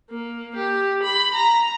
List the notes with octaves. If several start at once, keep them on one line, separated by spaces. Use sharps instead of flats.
A#3
G4
B5
A#5